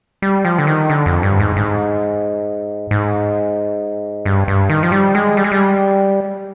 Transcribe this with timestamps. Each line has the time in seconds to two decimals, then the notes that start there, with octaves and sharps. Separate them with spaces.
0.22 G3
0.45 F3
0.59 D3
0.67 D#3
0.90 D3
1.06 F2
1.23 G2
1.40 G#2
1.56 G#2
2.91 G#2
4.26 G2
4.48 G2
4.70 D#3
4.83 F3
4.92 G3
5.15 G#3
5.37 G3
5.44 G#3
5.52 G3